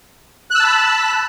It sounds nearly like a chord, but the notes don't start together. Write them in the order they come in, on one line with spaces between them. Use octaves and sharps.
F#6 E6 A5 B5